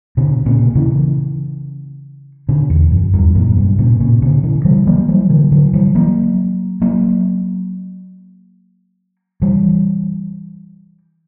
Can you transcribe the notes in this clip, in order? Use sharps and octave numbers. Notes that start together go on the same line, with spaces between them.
B2 D3
A#2 C#3
C#3 E3
B2 D3
E2
F#2
E2 G2
F#2 A#2
G2 B2
A#2 C#3
A#2 C#3
B2 D3
C#3 E3
E3 G3
F#3 A#3
E3 G3
D3 F#3
D3 F#3
E3 G3
F#3 A#3
F#3 A#3
E3 G3